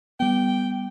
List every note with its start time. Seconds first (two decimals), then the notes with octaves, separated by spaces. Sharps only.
0.20 G3 B3 G5